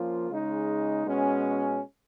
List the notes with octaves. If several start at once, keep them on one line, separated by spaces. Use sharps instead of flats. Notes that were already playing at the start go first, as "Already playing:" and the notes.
Already playing: F3 A#3 C#4 F4
C#3 G#3 D#4
B2 G#3 C#4